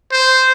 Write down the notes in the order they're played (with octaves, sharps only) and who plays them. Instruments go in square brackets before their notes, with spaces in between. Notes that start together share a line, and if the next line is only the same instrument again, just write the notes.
[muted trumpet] C5